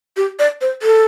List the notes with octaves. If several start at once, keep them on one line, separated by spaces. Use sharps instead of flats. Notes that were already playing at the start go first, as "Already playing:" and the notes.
G4
D5
C5
A4